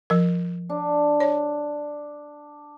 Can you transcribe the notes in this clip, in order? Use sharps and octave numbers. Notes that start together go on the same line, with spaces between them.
F3 A#4
D4
C#5